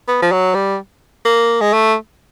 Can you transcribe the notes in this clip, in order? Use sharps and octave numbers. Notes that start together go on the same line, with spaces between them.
B3
F3
F#3
G3
A#3
G#3
A3